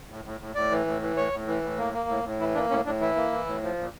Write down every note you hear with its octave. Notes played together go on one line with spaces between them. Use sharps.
A2
A2
A2
A2 D5
E3
A2
E3
A2 C#5
A2
E3
A2
A#3
A#3
A2
A2
E3 E4
A#3 D4
A2 C#4
A2 D4
E3 E4
A#3
E3
A2
F3
A#2